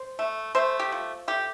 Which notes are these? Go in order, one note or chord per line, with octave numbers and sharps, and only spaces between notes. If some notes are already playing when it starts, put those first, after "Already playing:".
Already playing: C5
A3
A3 C5
G4
F3
A3 G4